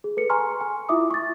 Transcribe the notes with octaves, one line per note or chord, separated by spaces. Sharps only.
G#4
A4 B4 C#7
G#5 A#5 C6 C#6 F6
G#5
E4 F4 E5 D6 D#6
C#6 A6